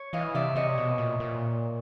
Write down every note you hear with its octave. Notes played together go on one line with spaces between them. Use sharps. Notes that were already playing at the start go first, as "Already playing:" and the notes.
Already playing: C#5
E3 D#5 F5
C3 D5 E5
C3 C#5 D#5
B2
A#2
A#2